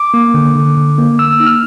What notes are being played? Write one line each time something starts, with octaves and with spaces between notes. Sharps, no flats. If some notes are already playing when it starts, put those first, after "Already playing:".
Already playing: D6
A#3
D3
D3
D3
A#3
A#3 E6
D#4
F6